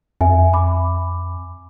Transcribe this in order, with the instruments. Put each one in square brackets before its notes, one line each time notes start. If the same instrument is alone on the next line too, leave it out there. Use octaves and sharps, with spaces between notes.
[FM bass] F2 [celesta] E5 G#5
[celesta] B5 D6